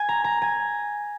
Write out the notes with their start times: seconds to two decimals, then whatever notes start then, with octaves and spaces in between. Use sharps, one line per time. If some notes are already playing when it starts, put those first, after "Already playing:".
Already playing: G#5
0.09 A#5
0.24 A#5
0.42 G#5